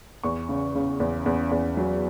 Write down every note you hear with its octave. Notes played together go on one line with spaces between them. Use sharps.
E2 C#6
C#3
C#3
E2
E2
E2
F#3